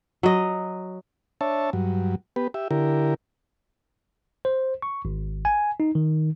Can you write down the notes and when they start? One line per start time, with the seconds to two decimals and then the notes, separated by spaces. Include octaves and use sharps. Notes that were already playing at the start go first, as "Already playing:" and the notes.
0.23 F#3 D#5
1.41 D4 C#5 E5 A5
1.73 G2 F#3
2.36 B3 G4 B4
2.54 G4 E5
2.71 D3 E4 G4 A#4
4.45 C5
4.82 C#6
5.05 G#1
5.45 G#5
5.80 D#4
5.95 D#3